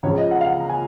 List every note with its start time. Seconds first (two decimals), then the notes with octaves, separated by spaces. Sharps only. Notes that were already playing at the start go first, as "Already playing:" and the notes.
0.03 C#2 C#3 F3 C#5
0.18 D#5
0.31 F#5
0.41 F5
0.46 F#5
0.60 A#5
0.69 G#5